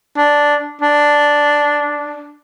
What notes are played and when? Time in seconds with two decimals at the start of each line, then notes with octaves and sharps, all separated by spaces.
0.16 D4
0.81 D4